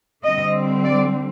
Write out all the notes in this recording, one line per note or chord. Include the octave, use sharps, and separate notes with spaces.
D3 G3 C4 D#5
D5